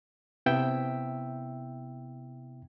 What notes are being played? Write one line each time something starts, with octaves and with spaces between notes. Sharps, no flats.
C3 B3 E4 E5 G5 E6